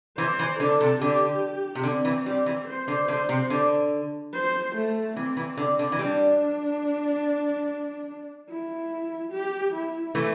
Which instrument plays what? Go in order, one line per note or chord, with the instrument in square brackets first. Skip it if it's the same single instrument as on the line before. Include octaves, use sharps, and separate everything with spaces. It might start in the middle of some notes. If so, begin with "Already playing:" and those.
[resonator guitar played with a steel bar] E3 [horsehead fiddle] C5
[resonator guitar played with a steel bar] E3
[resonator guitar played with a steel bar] D3 [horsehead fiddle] A4
[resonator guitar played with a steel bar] C3
[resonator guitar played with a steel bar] D3 [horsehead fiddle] G4
[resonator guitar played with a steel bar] C3
[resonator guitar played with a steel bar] D3 [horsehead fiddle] C4
[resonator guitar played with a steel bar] E3
[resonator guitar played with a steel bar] G3 [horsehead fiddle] C4
[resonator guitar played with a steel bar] E3
[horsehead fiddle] C5
[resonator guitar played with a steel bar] D3
[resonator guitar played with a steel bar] D3 [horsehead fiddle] C5
[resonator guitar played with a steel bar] C3
D3
[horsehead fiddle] C5
A3
[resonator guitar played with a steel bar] E3 [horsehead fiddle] C4
[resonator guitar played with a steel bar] E3
D3
D3
E3
[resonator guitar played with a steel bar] G3 [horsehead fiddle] D4
[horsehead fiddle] E4
G4
E4
[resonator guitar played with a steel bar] E3 A3